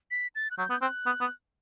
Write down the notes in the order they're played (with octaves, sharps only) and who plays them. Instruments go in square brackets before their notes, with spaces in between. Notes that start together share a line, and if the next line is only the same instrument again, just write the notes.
[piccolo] B6
A6
F#6
[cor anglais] F#3 [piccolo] G6
[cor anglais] B3
[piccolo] G6
[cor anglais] C4 [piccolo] F#6
[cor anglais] B3
B3